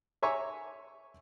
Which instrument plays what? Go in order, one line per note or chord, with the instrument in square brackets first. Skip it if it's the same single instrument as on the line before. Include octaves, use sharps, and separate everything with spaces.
[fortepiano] C#5 E5 G#5 A#5 C#6 D6